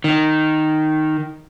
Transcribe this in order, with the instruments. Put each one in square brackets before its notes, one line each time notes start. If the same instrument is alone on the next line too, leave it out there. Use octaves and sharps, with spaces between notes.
[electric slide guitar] D#3